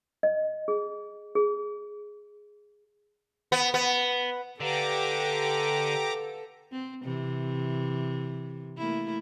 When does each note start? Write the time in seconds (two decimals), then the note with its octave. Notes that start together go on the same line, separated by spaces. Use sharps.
0.23 D#5
0.68 G#4
1.35 G#4
3.52 B3
3.74 B3
4.60 D3 G4 A4 B4 F5 F#5 A#5 D6
6.72 C4
7.04 C3 E3
8.78 A3 A#3 E4